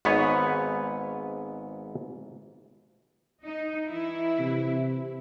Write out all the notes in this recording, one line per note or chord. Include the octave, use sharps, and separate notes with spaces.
G#1 G#2 B3 B4 C#5
D#4
E3 E4
C3